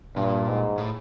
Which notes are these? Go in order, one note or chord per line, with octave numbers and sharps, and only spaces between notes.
G2 A#2
G#2
A2